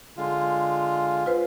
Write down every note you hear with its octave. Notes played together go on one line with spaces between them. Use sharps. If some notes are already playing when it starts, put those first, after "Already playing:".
D3 G#3 F4
F4 B4 C5